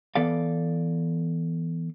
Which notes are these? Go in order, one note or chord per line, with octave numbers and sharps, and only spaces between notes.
E3 B3 A4 D5 F5